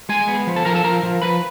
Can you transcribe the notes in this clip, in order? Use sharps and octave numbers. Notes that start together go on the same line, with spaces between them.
G#3 G#4 G#5
B3
F3
A4 A5
F3 A#4 A#5
A4 A5
F3 A#4 A#5
F3
F3 B4 B5